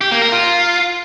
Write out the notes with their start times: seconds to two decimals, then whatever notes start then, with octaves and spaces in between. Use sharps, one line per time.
0.01 G4
0.11 A#3
0.22 A#4
0.32 F4